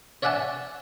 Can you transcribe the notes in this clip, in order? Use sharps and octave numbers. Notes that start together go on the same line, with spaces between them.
C#5 D5 E5 F#5 G#5 A5